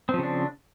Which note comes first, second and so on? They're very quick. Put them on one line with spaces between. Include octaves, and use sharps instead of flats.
C4 F3 C#3 D4